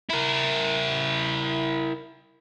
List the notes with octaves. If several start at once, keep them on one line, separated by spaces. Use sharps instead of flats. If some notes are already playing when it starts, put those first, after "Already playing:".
E4 A#4